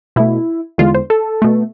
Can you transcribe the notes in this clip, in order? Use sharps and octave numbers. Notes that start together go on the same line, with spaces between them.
B2 A3 E4
E2 D3 G#3 F4
C5
A4
B2 A3